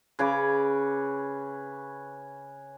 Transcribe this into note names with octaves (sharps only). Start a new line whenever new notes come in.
C#3 B4 C#5 D6